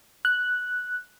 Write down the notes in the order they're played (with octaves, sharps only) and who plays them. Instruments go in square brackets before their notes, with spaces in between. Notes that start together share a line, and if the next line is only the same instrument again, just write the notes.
[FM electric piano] F#6